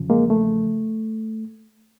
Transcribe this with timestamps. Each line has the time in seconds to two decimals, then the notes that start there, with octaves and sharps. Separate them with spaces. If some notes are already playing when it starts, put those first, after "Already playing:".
Already playing: E2 C#3 F3
0.10 G#3 A#3
0.30 A3